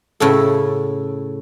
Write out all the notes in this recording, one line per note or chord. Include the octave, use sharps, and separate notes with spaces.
A2 C#3 A4